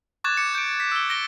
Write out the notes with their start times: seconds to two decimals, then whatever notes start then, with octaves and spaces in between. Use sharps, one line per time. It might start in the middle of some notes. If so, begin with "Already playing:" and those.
0.24 C#6 D6 F#6 G#6 A6 E7
0.37 D6 C#7
0.55 G6 C#7 D7
0.80 B6
0.92 E6 G7
1.10 A#6 D7 G7